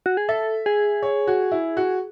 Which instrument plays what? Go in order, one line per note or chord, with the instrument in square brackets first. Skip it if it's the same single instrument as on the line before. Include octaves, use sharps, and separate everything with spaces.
[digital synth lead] F#4
G#4
[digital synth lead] A4 [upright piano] E5
[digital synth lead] G#4
[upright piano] C#5
F#4
E4
F#4